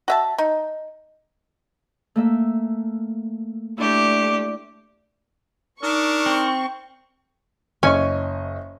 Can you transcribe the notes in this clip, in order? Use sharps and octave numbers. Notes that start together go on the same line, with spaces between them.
F#4 E5 A5
D#4
A3 A#3 E5
A3 D4 E4 G4 D5 G6
D4 D#4 A#4 C#6
C4
F#1 C#4 D#5 G#5 C#6